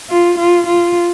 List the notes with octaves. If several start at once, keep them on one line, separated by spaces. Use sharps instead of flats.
F4
F4
F4